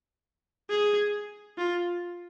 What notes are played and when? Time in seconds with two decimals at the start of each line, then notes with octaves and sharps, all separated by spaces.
0.70 G#4
1.58 F4